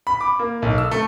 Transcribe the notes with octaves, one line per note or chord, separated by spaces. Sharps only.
B5
D6
A#3
B1
E6
A3